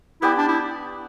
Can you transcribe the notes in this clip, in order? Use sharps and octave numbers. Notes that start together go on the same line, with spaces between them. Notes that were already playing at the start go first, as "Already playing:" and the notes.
B3 E4 G4 D5
D4
E4